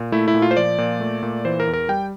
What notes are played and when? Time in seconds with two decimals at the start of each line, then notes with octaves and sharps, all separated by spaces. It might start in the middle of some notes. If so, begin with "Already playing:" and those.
Already playing: A#2
0.12 A3 E4
0.28 E4
0.34 A#2
0.42 F4
0.51 C5
0.57 F3 D5
0.78 A#2
1.00 A3
1.23 A#2
1.45 E3 C5
1.60 A#4
1.67 E2
1.73 A#4
1.89 G3 G5